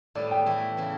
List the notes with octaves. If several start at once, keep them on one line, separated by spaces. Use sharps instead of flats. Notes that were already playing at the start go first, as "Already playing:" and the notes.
A2 G3 B3 D5
G5
E3 A3 E4
C#3 E3